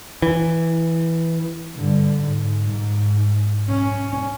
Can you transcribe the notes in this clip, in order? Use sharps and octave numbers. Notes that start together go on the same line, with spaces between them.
E3
G2 D3
G#2
G#2
C#4